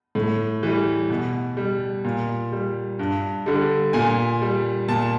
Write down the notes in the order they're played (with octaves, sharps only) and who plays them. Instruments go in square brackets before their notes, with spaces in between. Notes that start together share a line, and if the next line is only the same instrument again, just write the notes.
[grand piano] A2
E3 G3
B2
G3
A#2
G3
G2
D3 G3
A#2 G#5
G3
A#2 A5